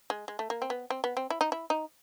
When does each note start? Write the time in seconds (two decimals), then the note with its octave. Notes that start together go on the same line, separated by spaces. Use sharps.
0.10 G#3
0.28 G#3
0.39 A3
0.50 A#3
0.62 C4
0.70 B3
0.90 C4
1.04 B3
1.17 C4
1.30 E4
1.41 D#4
1.52 E4
1.70 D#4